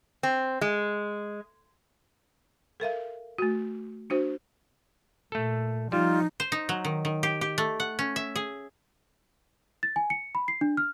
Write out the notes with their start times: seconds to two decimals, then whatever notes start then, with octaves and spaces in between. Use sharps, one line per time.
0.23 C4
0.61 G#3
2.80 A4 A#4 E5 F5
3.38 A3 F#4
4.10 D4 F#4 C5
5.32 A#2 A3 A4
5.92 F3 G3 D#4 F4
6.40 C5
6.52 D#4
6.69 F#3
6.85 D#3
7.05 D#3
7.23 G4
7.41 G4
7.58 A3
7.80 F#5
7.99 C#4
8.16 E5
8.36 G#4
9.83 A6
9.96 G#5
10.10 C#7
10.35 B5
10.48 C7
10.61 D4
10.77 F6